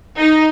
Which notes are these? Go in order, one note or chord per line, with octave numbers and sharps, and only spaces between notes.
D#4